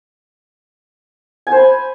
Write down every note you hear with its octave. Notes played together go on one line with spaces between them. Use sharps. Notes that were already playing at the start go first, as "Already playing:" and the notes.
G#5
C5
B5